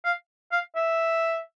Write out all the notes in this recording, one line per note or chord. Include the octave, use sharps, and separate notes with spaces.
F5
F5
E5